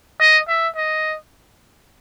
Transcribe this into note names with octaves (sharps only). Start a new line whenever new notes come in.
D#5
E5
D#5